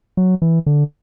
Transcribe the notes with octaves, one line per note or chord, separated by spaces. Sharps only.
F#3
E3
D3